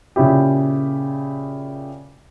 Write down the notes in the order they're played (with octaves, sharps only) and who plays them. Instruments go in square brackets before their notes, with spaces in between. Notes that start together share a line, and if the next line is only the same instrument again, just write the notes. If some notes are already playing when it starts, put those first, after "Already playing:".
[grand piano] A#2 C#3 C#4 E4 G4